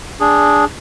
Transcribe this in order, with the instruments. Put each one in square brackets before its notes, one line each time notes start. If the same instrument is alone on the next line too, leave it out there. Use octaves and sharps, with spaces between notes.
[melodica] D4 G#4